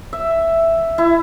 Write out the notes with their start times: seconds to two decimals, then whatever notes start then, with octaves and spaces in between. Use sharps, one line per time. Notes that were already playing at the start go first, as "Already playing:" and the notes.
0.13 E5
0.98 E4